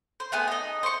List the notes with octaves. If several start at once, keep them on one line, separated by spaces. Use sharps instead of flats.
C5
A3 B3 G#4
D#4 D#5
C5 C#6